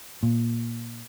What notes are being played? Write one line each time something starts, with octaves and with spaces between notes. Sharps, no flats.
A#2